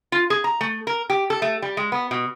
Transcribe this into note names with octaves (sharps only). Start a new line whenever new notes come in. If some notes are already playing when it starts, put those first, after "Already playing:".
F4
G#4
A#5
A3
A#4
G4
A4
A3
G3
G#3
B3
B2